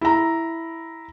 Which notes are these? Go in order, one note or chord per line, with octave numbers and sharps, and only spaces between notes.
E4 A#5